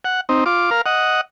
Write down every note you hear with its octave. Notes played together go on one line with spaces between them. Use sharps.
F#5
C4 D#4
F4 D6
A#4 F5
D#5 F#5